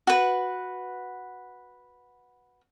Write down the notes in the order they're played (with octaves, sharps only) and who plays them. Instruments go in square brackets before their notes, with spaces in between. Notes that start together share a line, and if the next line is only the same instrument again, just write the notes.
[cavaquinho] F#4 B4